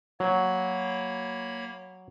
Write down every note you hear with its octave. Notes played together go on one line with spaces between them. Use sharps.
F#3 A#3 C#5 B5